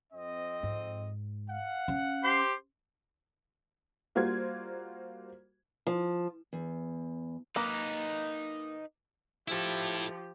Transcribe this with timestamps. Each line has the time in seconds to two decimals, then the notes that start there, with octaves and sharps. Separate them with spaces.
0.13 F2 C4 D#5
0.63 G#2
1.49 F5 F#5
1.88 C#4
2.24 G4 C5 C6
4.15 G3 A#3 F4 F#4 C5 G#6
5.87 F3
6.53 E2
7.56 A#3 D#4 B4
9.48 F3 E4 G4 A4